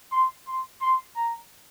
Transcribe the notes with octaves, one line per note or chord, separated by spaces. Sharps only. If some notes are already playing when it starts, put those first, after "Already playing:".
C6
C6
C6
A#5